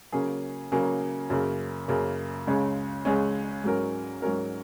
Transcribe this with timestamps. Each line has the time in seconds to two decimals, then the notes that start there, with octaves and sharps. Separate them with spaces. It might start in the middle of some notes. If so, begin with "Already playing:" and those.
0.12 C#3 F#3 A#3 C#4 G#4
0.72 C#3 F#3 A#3 C#4 G#4
1.30 F#2 C#3 A#3
1.88 F#2 C#3 A#3
2.47 C#2 C#3 G#3 C#4
3.05 C#2 C#3 G#3 C#4
3.64 G#2 F#3 C#4 A#4
4.22 G#2 F#3 C#4 A#4